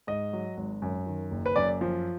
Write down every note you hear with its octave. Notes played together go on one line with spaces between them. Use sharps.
G#2 D#5
F#3
G#1
F#2
D#3
F#1
B4
F#2 D5
F3